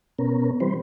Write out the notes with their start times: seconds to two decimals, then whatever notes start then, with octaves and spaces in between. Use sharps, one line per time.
0.19 B2 B3 C#4 A#4
0.60 E3 G3 C4 B4 C5